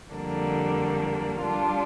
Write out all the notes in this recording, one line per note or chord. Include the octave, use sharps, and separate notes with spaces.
F2 D3 G3 A#3 D4
G3 D4 F4